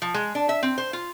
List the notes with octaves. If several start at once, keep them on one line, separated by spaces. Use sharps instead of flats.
F3
G#3
D4
E5
C4
C5
F4